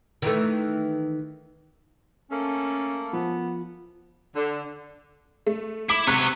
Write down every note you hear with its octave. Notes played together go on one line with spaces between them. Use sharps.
D#3 E3 A3
A3 A#3 C#4 A4
F3 B3
D3
A3
E4 D6
C3 B3 C#5 F#6 B6